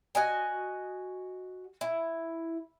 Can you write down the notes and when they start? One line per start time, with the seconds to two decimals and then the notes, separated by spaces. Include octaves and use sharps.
0.15 F#4 D#5 G#5
1.81 E4